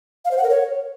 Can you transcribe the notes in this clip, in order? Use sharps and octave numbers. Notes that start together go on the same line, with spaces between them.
F5
C5
F#5
A#4
C#5